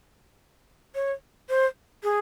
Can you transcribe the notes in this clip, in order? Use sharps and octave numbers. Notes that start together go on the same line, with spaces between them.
C#5
C5
G#4